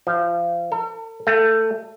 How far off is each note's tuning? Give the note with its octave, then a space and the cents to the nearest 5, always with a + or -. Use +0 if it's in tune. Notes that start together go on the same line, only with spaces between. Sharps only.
F3 -25
A4 +45
A3 +20